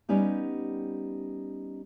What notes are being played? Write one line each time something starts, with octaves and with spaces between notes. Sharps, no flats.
G3 B3 C#4 D#4 G4